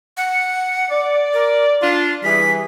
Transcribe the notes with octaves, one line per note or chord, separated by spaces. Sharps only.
F#5
D5
A#4
D4 F4 C6
E3 G3 G#4 B6